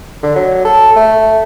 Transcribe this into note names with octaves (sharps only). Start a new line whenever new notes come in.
D3
F#3
A4
A3